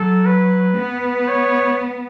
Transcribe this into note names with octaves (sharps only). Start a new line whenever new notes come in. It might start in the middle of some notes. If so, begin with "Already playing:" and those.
Already playing: F#3 A4
B4
B3
C#5